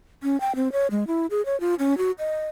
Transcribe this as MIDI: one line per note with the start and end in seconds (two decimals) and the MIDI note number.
0.23 0.39 61
0.40 0.55 79
0.56 0.71 60
0.72 0.87 73
0.91 1.07 56
1.07 1.26 64
1.31 1.44 68
1.45 1.59 73
1.60 1.75 65
1.79 1.97 61
1.98 2.11 66
2.19 2.49 75